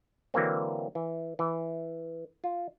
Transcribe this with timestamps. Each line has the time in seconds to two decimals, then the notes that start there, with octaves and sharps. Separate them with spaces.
0.34 D3 E3 F#3 A#3 C4
0.95 E3
1.39 E3
2.44 F4